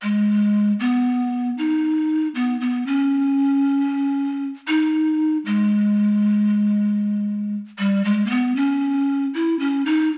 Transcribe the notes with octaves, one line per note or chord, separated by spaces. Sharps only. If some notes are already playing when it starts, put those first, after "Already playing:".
G#3
B3
D#4
B3
B3
C#4
D#4
G#3
G3
G#3
A#3
B3
C#4
E4
C#4
D#4